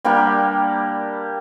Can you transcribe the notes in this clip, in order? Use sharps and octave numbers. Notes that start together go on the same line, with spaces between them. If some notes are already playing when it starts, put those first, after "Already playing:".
G3 A#3 D4 G4